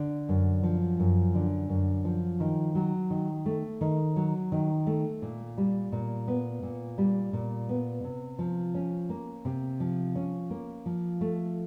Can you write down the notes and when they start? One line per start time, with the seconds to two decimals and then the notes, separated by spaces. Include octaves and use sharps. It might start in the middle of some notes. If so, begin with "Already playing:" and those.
Already playing: D3
0.29 F#2
0.63 F3
0.99 F#2
1.35 D3
1.69 F#2
2.05 F3
2.40 D#3
2.75 F#3
3.10 D#3
3.46 A3
3.81 D#3
4.16 F#3
4.52 D#3
4.87 A3
5.22 A#2
5.58 G3
5.92 A#2
6.28 B3
6.63 A#2
6.98 G3
7.33 A#2
7.69 B3
8.04 C3
8.39 F3
8.75 C#4
9.09 A#3
9.45 C3
9.80 F3
10.15 C#4
10.50 A#3
10.86 F3
11.21 A3